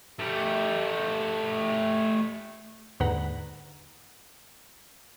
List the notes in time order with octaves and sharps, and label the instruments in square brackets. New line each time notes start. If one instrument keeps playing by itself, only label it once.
[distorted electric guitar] A3 G4
[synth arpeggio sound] D#2 G#2 D3 B4 F#5 A#5